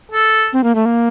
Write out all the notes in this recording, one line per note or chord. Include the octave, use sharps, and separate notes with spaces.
A4
C4
A#3
A3
A#3